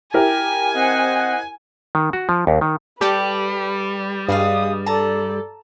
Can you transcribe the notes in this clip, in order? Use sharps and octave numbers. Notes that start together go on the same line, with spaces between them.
E4 G4 A#4 G5 G#5
C4 C5 D#5 F#5
D#3
F#4
F3
D#2
D#3
G3 G4 A4 B4 D5 A5
G2 G#3 G#4 B4 F5 D#6
A4 D5 A5 A#5